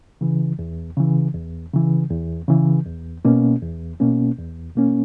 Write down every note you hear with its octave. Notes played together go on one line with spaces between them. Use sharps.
C#3 E3
E2
C#3 E3
E2
C#3 E3
E2
C#3 E3
E2
B2 A#3 C#4
E2
B2 A#3 C#4
E2
B2 A#3 C#4